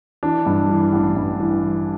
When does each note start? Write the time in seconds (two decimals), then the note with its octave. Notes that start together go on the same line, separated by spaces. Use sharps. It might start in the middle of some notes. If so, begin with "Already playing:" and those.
0.23 E3 D4
0.46 G2
0.70 E3
0.92 A1
1.16 G2
1.40 E3